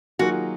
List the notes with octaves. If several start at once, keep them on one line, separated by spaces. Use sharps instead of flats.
D#3 F#3 A#3 F4 F#4 G#4